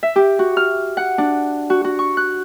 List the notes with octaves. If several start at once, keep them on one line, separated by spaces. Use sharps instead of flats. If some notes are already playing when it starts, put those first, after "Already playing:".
E5
G4
F#4
F6
F#5
D4
F#4
F#4
C#6
F#6